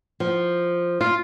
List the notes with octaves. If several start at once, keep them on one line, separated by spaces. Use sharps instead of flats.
F3
F4